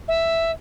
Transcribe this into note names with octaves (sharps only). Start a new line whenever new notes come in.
E5